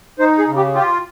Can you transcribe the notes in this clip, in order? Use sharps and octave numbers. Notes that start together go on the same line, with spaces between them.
D#4 C5
G#4
C#3
G4
F4 G4